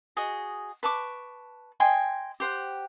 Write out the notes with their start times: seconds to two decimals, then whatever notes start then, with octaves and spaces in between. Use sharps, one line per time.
0.17 F#4 G#4 D#5
0.83 B4 A5 C#6 D6
1.80 D#5 G5 G#5 C6
2.40 G4 C5 F#5